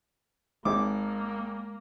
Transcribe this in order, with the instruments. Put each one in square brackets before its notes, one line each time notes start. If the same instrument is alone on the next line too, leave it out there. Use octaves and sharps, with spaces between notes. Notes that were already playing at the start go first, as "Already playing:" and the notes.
[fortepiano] G#1 D6 [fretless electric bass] G#3 [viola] A#3